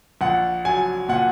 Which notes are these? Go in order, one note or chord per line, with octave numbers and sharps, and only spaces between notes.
A#1 F#5
F#3 G#5
A#2 F#5